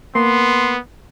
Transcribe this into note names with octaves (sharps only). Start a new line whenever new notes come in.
A#3 B3 C6